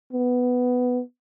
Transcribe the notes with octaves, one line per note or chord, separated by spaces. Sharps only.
B3